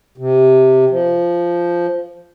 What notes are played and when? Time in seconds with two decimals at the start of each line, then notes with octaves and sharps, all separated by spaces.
0.18 C3
0.90 F3